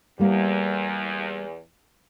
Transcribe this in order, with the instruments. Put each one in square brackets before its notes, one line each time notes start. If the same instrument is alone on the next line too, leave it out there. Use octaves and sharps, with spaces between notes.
[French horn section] E2 [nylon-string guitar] G3 A#3